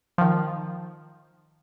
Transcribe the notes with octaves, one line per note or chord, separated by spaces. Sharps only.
D#3 F3